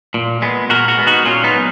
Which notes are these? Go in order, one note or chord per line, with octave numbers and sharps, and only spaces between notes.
A#2
G#3 B3
A#2 F#4 A#4
F#4 A#4
G#3 B3
D#4 F#4
A#2 C#4 F4
B3 D#4
F#3